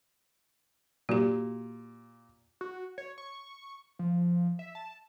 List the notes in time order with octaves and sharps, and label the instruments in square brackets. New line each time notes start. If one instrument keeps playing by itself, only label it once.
[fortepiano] A#2 [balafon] F#4 G4
[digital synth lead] F#4
C#5
C#6
F3
E5
A5